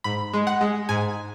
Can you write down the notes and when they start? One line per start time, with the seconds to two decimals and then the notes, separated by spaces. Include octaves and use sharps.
0.04 G#2 B5
0.33 G#3
0.47 F#5
0.61 G#3
0.89 G#2 G#5